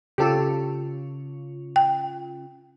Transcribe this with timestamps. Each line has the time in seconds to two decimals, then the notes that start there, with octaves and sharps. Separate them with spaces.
0.18 C#3 C#4 F4 G4 A4
1.76 G5